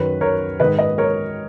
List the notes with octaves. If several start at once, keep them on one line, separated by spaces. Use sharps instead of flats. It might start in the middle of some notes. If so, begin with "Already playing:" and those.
Already playing: F#2 D#3 B4
A#4 C#5
G#2 D#3 B4 D#5
B4 D#5
A#4 C#5